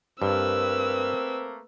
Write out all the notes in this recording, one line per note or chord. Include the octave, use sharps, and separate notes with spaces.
G2 A3 A#3 C4 A#4 B4 E6